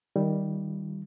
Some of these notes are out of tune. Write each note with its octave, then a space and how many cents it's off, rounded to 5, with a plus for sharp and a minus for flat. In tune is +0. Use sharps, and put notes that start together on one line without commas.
D#3 +0 G3 -5 F4 -30